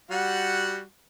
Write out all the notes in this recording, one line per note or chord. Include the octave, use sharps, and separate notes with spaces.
G3 F#4 F#5